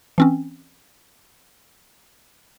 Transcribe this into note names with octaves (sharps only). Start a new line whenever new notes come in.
E3 C4 C#4